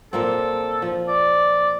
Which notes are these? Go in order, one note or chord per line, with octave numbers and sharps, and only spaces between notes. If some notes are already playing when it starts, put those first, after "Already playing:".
A#2 A#3 C4 A4
F3
D5